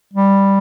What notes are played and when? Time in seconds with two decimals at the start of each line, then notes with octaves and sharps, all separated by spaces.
0.13 G3